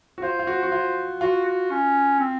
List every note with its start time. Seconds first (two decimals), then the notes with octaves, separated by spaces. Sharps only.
0.18 F#4
0.22 F4 C5
0.39 F4
0.47 F#4
0.63 F#4
0.72 F4
1.21 F4 F#4
1.46 F#4
1.71 C#4
2.20 C4